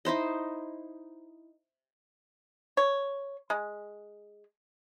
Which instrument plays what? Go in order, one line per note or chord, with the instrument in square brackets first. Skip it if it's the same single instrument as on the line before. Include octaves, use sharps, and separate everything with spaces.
[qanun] D#4 E4 C5 D#5
[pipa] C#5
G#3